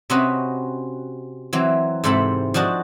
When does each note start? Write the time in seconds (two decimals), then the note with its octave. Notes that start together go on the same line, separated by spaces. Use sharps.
0.10 C3 C4 C#4 F#4 B4 D#5
1.53 E3 F#3 C4
2.04 G#2 C3 C4 A4 B5
2.54 F3 D4 F#4 D#5 A5